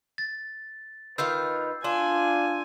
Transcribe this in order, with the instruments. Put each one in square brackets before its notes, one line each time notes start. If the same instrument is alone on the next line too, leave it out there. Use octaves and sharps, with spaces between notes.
[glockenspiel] A6
[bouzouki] D#3 F4 F5 [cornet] B4 [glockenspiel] E6 G6 C7
[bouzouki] D4 [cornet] F4 [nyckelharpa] G#5 [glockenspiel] C6